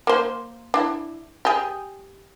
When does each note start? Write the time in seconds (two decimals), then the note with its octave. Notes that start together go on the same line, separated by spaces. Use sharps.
0.07 A#3 C5
0.74 D4 E4
1.45 G4 G#4